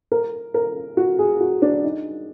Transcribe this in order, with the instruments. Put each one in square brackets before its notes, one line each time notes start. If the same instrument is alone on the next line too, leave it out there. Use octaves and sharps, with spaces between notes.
[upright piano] A#4
A#4
F#4
G#4
F#4
D4
D#4